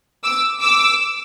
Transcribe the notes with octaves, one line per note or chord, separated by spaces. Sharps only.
D6 E6
D6 E6